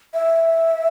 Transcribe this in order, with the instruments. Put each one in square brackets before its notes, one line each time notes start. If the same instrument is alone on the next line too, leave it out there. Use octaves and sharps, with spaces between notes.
[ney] E5